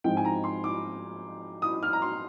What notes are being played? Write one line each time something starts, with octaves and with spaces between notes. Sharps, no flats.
G#2 F3 G#3 C4 G5
G#5
A#5
C6
D6
D#6
F6
A#5
C6